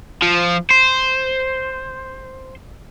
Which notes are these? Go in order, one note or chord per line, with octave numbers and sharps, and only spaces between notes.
F3
C5